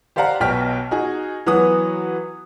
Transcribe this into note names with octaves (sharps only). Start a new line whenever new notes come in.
G4 C5 D5 F5 F#5 A#5
B1 B2 G5 F6 B6
D#4 F#4 G#4
E3 F#3 B3 F#4 D#6